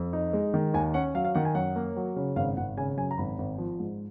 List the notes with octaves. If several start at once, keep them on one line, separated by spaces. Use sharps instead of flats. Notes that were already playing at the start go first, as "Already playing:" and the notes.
Already playing: F2
D#4
G#3
D#3
D#2 G#5
C#4 F#5
F#3 F5
F5
D#3 F#5
G#5
F#2 F#5
A#3
F#3
C#3
G#1 F5
G#1 F#5
C#3 G#5
F#2 G#5
A#5
G#1 B5
G#1
F3
G#2